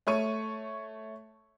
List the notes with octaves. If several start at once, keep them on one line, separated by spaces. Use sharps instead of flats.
A3 C#5 C#6 D#7